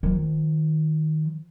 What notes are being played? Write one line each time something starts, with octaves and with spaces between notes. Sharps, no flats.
D#3 F3